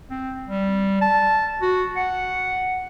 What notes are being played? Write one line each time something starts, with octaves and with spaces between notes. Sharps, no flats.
C4
G3
A5
F#4
F#5